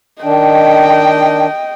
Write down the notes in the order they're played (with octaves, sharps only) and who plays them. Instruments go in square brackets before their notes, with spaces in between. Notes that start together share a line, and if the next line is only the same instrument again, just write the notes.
[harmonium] D#3 D4 [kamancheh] D#5 G5